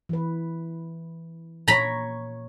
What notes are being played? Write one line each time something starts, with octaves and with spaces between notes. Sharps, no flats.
E3 B4
A#2 C#5 A#5 B5